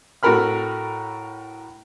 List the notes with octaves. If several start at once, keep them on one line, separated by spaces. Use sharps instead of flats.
A2 F#4 A4 A#4 B5 F6